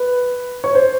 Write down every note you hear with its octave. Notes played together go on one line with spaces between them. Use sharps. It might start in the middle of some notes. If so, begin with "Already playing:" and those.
Already playing: B4
C#5
C5